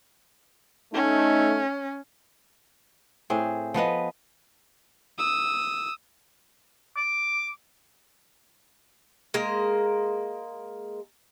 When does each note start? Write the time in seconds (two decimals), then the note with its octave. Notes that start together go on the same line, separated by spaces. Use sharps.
0.94 A3 C#4 D#4
3.30 A2 C4 G#4
3.74 F3 B3 B4 D#5
5.19 D#6 E6
6.96 D6
9.34 G#3 A#3 A#4